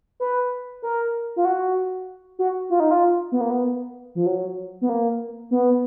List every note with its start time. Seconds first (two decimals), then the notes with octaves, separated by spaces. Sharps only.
0.20 B4
0.82 A#4
1.36 F4
1.45 F#4
2.39 F#4
2.70 F4
2.80 D#4
2.91 F4
3.32 B3
3.41 A#3
3.50 B3
4.15 F3
4.26 F#3
4.81 B3
4.89 A#3
5.51 B3